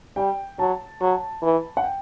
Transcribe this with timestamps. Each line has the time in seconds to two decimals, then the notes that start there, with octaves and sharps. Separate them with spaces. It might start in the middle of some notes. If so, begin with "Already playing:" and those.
0.16 G3 G5
0.59 F#3 A5
1.01 F#3
1.42 E3
1.77 F#5
1.84 G5